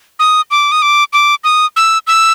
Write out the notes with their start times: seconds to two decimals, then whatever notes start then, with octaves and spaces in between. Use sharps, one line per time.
0.19 D#6
0.51 D6
0.72 D#6
0.82 D6
1.13 D6
1.44 D#6
1.76 E6
2.07 E6